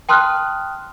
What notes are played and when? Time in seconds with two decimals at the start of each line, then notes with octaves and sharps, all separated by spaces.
0.09 G5 A5 C6 D#6 F6 F#6